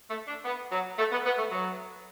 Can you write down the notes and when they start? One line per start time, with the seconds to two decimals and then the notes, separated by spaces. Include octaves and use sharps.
0.10 A3
0.28 D4
0.45 B3
0.72 F#3
0.99 A3
1.12 B3
1.26 B3
1.38 A3
1.51 F#3